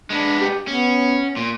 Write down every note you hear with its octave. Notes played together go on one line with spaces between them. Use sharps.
G#3 B3 D4
G4
B3 C#4
A#2